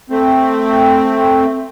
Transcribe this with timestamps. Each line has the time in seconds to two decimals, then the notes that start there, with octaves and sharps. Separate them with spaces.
0.10 A3 C4